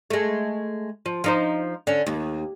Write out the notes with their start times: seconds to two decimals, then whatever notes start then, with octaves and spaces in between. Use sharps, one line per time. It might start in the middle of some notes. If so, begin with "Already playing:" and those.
0.10 G#3 A3
1.06 F3
1.24 F3 D#4 C5
1.87 D3 C#4
2.06 D#2